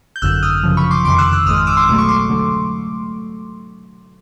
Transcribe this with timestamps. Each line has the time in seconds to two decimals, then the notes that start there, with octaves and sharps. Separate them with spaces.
0.16 G6
0.22 G#1 F#2 D3 E6 F#6
0.43 D#6 F6
0.63 F#2 C#3 F3
0.77 B5 C#6
0.91 C6 D6
1.05 F2 C3 D#3 C6 D6
1.18 E6 F#6
1.33 E6 F#6
1.46 G#1 G#2 D#3 G#3 D#6 F6
1.56 D#6 F6
1.67 D6 E6
1.77 C6 D6
1.88 C2 B2 F#3 A3 D6
1.98 C#6
2.08 C6 D6
2.30 D3 F#3 A3